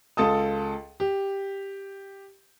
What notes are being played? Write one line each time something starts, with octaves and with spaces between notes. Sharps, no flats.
C#2 F4 A4 A5 D#6
G4